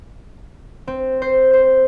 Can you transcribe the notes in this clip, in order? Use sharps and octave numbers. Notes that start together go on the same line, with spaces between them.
C4
C5
C5